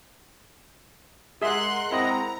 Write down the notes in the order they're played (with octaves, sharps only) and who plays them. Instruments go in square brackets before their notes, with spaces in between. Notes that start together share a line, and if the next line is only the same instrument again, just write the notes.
[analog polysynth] G#3 A#4 F#5 [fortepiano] G#4 E5 [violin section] C6 F#6
[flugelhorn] C4 [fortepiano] E4 D#5 [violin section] A#5